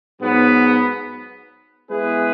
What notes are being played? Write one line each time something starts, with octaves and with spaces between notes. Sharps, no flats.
G#2 F#3 B3
G#3 B3 E4 G#4 B4